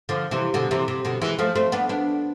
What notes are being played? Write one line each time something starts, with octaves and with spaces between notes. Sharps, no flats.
D3 F3
C3 E3
B2 D3
C3 E3
C3
B2 D3
E3 G#3
F3 A3
A3 C4
B3 D4
B3 D4